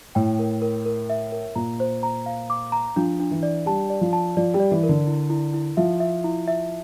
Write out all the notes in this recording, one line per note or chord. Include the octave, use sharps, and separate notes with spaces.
A2 G5
A#4
A#4
A#4
E5
A#4
A#2 A#5
C5
A#5
F5
D6
A#5
F3 D4
D4
E3
D5
G3 A5
D5
F3
A5
F3 D5
G3
D5
E3
A#4
D3
E4
E4
E4
F3 E5
E5
E4
E5